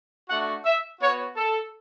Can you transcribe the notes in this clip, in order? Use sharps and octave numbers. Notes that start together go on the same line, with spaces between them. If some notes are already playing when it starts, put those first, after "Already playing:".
A3 D4 F#4 F#5
E5
B3 F#4 C#5
A4